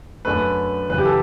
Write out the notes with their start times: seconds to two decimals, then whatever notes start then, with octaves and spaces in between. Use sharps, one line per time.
0.25 F#2 D3 A3 B4
0.89 F#2 C#3 E3 B4
0.98 G4
1.05 A4